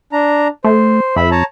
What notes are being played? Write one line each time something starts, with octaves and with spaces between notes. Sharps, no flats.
D4 A#5
A3 C5
F2 E5 B5
C#5 A5 A#5